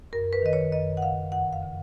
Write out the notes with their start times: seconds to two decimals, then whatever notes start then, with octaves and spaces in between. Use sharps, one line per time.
0.13 F#2 A#4
0.33 B4
0.42 D#3 D#5
0.53 C#5
0.72 F#2 D#5
0.97 F#5
1.02 C#3 F5
1.32 F2 F#5
1.53 F5
1.62 C#3